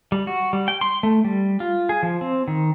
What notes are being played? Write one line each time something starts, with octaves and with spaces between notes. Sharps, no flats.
G3
F#4
G3
G5
C6
A3
G3
F4
G#4
F3
C4
D#3